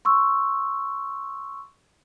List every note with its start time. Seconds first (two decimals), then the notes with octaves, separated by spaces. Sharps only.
0.05 C6 C#6 E6